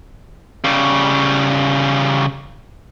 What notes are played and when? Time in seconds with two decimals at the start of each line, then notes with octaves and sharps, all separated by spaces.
0.64 C#3 G3